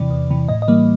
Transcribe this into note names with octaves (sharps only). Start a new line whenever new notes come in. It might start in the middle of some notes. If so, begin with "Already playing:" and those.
Already playing: E2 C3 E3 D5
E2
C3 E3
A2 D#5
D#5
E3 G3 A#3